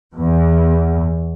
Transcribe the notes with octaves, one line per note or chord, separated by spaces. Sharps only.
E2